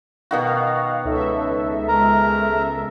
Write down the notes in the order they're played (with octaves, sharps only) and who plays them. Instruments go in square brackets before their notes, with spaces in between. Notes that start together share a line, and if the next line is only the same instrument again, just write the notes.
[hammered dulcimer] B2 D#3 F#4 [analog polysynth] F5
[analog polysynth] C#2 A4 E5 [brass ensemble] D#4 B4 C#5
[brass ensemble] G#3 [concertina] A#4 A#5